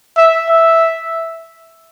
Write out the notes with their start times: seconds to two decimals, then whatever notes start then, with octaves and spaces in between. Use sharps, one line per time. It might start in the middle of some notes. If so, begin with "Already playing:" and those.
0.17 E5
0.50 E5